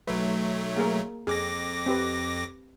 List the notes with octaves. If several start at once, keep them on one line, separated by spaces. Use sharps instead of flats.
B1 F#3 A3 B4
A#3 G#4 A#4
F2 G#4 D6 A#6
C4 G4 B4